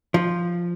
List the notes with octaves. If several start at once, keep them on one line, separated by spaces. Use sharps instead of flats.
F3